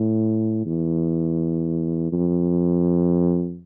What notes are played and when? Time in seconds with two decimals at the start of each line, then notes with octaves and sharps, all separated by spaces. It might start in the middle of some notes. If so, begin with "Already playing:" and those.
Already playing: A2
0.66 E2
2.12 F2